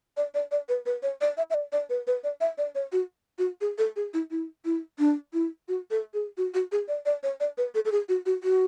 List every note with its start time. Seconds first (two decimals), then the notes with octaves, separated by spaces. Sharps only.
0.17 D5
0.35 D5
0.52 D5
0.69 B4
0.86 B4
1.03 C#5
1.21 D5
1.37 E5
1.50 E5
1.54 D5
1.72 D5
1.90 B4
2.07 B4
2.24 D5
2.41 E5
2.58 D5
2.75 C#5
2.92 F#4
3.39 F#4
3.61 G#4
3.78 A4
3.96 G#4
4.14 E4
4.31 E4
4.65 E4
4.99 D4
5.33 E4
5.68 F#4
5.91 A4
6.14 G#4
6.37 F#4
6.54 F#4
6.72 G#4
6.88 D5
7.06 D5
7.23 C#5
7.40 D5
7.58 B4
7.75 A4
7.85 A4
7.92 G#4
8.09 F#4
8.26 F#4
8.43 F#4